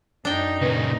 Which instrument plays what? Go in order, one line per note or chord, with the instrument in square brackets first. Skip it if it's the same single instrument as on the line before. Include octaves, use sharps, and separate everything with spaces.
[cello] F#2 D#4 [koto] D4 G5
[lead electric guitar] A#2 C#3 [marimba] B4